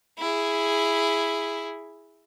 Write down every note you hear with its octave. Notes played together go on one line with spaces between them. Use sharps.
E4 G#4